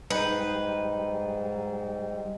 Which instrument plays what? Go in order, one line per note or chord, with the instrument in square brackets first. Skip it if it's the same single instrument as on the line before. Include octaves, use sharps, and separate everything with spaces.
[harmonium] G#2 [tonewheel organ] G3 [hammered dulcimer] D#4 G#4 [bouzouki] B4